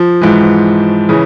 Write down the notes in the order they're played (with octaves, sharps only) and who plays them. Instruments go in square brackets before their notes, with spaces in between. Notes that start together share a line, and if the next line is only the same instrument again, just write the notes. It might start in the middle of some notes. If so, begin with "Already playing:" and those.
Already playing: [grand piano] F3
G#2 E3
C#3 E3